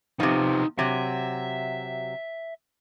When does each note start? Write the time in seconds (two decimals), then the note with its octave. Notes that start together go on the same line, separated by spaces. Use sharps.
0.20 C3 F3 B3 D#4
0.79 C3 F#3 E5